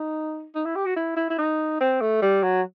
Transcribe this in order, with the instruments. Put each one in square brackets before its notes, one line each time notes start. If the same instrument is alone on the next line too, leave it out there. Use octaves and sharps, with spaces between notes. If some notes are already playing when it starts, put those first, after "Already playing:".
Already playing: [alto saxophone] D#4
D#4
E4
G4
F#4
E4
E4
E4
D#4
C4
A3
G3
F#3